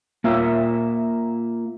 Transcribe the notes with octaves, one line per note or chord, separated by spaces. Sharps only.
A#3 F4 E5